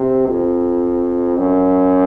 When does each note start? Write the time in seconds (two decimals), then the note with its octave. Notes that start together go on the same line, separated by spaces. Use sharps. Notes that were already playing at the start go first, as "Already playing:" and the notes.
Already playing: C3
0.27 F2
1.39 F#2